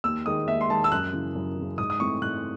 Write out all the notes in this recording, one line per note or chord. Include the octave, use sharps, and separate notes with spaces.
D#2 E6
D#3 G#3 D#6
D#2 E5
C6
D#3 G#3 A5
E6
F#2 F#6
C#3 E3
F#2
C#3 E3
G#2 D#6
D#6
E3 A3 C4 C#6
G#2 F#6